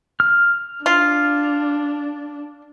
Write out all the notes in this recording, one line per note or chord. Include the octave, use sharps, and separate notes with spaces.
F6
D4 F4